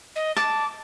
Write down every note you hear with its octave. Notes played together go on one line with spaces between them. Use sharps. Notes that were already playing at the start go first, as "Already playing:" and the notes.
D#5
A5 D6